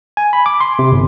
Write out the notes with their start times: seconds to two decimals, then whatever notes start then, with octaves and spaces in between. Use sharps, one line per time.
0.17 G#5
0.33 B5
0.46 D6
0.60 C6
0.79 C3
0.92 G1